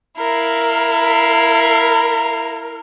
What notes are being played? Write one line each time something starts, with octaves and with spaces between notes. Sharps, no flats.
E4 A#4 F5